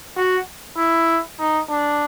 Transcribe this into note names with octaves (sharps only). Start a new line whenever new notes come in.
F#4
E4
D#4
D4